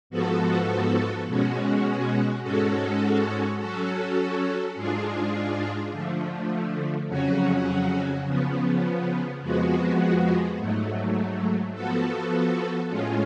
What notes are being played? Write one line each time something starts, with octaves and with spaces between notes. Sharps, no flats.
G#2 F3 B3 F#4 A4
B2 G#3 C#4 F#4
G#2 G#3 C#4 F#4 A4
F#3 C#4 F#4 A4
G#2 G#3 D4 F4 G#4
D3 F3 A3
F2 C#3 F#3 C#4 F#4
C#3 F3 B3
F2 F3 G#3 B3 F#4
G#2 F#3 A3
F3 B3 F#4 A4
A2 G#3 C#4 F4